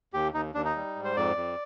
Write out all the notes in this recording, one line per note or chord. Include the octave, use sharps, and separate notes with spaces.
D#2 G4
D#2 D#4
D#2 D4
D#4
G3
G#2
C5
F2 D5
F2